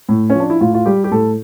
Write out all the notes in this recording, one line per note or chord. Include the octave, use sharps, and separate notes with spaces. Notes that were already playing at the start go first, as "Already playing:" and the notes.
A2
C#4
F3
D4
E4
A2 F4
F4
G3 G4
G4
A2 A4